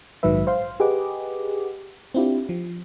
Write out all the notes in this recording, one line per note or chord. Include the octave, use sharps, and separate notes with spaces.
A#1 G#2 D#3 F#3 B4 E5
C5 F5 C6
G4 G#4 B4 D#5 F#5 D6
C4 D4 E4 F4 G4
F3